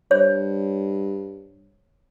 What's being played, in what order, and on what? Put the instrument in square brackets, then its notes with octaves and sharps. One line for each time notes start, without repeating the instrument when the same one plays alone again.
[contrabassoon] G2 [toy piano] C5 C#5